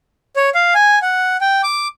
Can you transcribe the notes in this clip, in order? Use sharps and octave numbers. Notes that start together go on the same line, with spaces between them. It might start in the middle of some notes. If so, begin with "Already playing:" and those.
C#5
F5
G#5
F#5
G5
D6